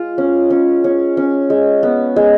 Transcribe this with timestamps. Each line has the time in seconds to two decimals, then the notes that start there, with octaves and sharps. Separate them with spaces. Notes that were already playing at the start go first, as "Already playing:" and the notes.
Already playing: G#3 F4
0.18 C#4
0.50 C#4
0.84 C#4
1.17 C#4
1.50 G#3
1.83 B3
2.16 G#3